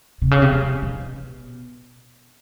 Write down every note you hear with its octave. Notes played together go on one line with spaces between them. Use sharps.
C3
C#3
C3
C3
B2